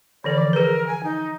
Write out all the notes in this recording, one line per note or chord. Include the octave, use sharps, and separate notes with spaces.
D3 E3 A4 D5
F3
G#4 A#4 B4
G#5
D#4